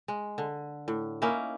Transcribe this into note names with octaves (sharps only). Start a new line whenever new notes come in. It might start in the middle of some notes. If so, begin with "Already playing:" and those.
G#3
D3
A2
A#3 C#4 D#4 E4